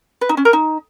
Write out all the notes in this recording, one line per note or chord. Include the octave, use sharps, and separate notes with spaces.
B4
D#4
C#4
A#4
D#4